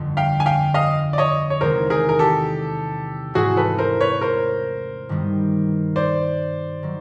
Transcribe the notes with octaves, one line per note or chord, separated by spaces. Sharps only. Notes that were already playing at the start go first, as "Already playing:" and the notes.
Already playing: G1 F2 D3
F5 G5
G#5
F5 G5
D#5 F5
D5
C#5 D#5
C#5
E2 C3 D#3 G#3 C4 A#4 C5
G#4 A#4
A#4
G4 A4
G#2 E3 A3 C4 E4 F#4 G#4
A4 B4
A#4 C5
B4 C#5
A#4 C5
G2 D#3 G3 B3
C5 D5
D#3 F#3